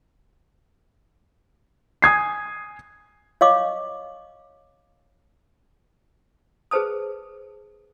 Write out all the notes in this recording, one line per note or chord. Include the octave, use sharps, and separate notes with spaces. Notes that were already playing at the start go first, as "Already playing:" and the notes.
G#5 D#6 G#6 C7
C#5 D#5 F5 C#6 D6
G#4 B4 C5 A5 D#6